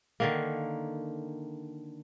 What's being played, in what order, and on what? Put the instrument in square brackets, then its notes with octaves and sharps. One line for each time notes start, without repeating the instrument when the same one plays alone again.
[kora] D3 D#3 A#3